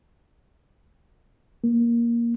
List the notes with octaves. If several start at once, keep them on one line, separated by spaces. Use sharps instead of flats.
A#3